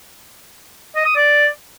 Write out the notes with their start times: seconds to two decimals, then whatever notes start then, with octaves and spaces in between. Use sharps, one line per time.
0.96 D#5
1.06 D#6
1.16 D5